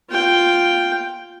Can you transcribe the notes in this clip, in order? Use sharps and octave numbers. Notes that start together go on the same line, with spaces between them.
F4 G5